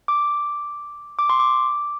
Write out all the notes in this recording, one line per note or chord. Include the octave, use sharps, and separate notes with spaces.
D6
D6
C6
D6